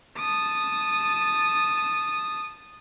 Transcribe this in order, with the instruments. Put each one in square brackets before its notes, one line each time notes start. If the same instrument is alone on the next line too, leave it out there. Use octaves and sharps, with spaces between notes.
[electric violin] A5 D#6